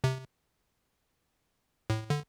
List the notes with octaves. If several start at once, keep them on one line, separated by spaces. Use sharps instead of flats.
C3
A2
D3